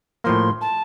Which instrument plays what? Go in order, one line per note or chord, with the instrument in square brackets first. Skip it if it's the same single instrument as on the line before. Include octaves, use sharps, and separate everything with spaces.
[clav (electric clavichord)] A2 F3 A#3 [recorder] C6
[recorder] A5